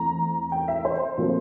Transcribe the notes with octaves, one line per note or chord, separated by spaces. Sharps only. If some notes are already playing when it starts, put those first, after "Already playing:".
Already playing: E2 E3 A3 C4 A#5
G5
E5
C5
A#2 F3 A3 C4